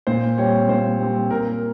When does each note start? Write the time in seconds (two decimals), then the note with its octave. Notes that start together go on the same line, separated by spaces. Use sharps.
0.07 A#2 C5
0.38 G3 C4 C#5
0.69 A#2 C5
0.99 G3 C4
1.31 A#2 A#4